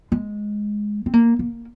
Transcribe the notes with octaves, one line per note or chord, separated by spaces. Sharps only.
G#3
C4
A#3
A#3